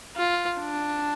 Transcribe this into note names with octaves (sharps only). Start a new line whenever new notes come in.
F4
D4